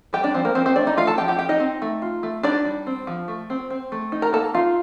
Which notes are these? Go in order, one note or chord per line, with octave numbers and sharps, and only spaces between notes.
G3 G4 G5
D4 D5
F3 C4 C5
A#3 A#4
F3 C4 C5
C4 C5
A3 D4 D5
D#4 D#5
A3 F4 F5
A4 A5
F3 G4 G5
G4 G5
F3 G4 G5
D#4 D#5
C4
A3
F4
A3
D4 D#4 D5
G3
C4
F3
A3
C4
C4
A3
D#4
A#4 A#5
A#3 A4 A5
D#4 F4 F5